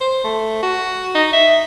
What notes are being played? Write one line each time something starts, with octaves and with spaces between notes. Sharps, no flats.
C5
A3
F#4
D#4
E5